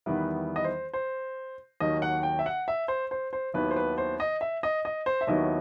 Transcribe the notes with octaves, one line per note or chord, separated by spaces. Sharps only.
E2 D#3 G3 B3 E4 B4
D#5
C5
C5
D#2 D#3 F#3 D#5
F#5
G5
E5
F#5
E5
C5
C5
C5
D#2 D#3 F#3 B3 E4 B4
C5
B4
C5
D#5
E5
D#5
D#5
C5
E5
D#2 D#3 F#3 B3 E4 D#5